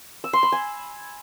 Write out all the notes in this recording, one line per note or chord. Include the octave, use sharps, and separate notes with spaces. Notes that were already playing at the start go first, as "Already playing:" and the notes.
E6
C6
B5
G#5